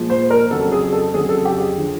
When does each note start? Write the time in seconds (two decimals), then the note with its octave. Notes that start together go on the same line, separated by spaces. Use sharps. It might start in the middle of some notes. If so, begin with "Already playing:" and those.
Already playing: A#2 F3 G#3
0.10 C5
0.30 A#4
0.51 F2 C#3 F#3 A4
0.72 G#4
0.92 A4
1.14 F2 C#3 F#3 G#4
1.29 A4
1.45 G4
1.60 G#4
1.77 D3 F3